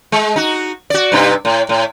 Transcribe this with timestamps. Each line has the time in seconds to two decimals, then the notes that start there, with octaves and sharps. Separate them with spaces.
0.12 G#3
0.36 D#4 F#4
0.90 F#4 D5
1.12 G2 C3 D#4
1.45 A2
1.69 A2